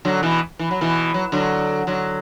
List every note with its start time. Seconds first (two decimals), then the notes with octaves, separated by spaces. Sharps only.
0.05 D3 F#3
0.23 B2 E3
0.59 E3
0.71 F#3
0.81 B2 E3
1.14 F#3
1.32 D3 F#3
1.87 D3 F#3